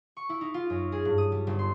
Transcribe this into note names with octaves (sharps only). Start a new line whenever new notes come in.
C#6
E4
D#4
F4
F#2
G#4
G2
D#6
G3
G1
C6